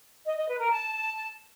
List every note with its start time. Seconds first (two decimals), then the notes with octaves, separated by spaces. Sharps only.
0.25 D#5
0.36 D#5
0.48 B4
0.59 A#4
0.70 A5